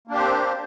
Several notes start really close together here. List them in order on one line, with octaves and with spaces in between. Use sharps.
A#3 D4 G4 C5 C4